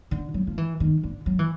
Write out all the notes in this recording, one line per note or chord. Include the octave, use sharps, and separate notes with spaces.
D3
F#3
F3
E3
D#3
D3
F#3
E3